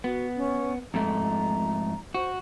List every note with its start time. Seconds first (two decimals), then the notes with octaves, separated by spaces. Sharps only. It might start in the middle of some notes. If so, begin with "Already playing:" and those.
0.04 B3 F#4
0.36 C#4
0.94 F2 G#2 A3 A#5
2.15 F#4 C5